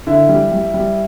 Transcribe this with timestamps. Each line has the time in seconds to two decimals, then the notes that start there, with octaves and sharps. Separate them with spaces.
0.07 D3 E4
0.29 G3
0.52 G3
0.74 G3